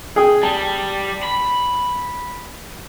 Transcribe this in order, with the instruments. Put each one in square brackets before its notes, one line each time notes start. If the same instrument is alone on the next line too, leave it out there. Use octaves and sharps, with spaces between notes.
[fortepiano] G#4 G5 D#6
[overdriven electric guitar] G3 [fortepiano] A5
[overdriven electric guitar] B5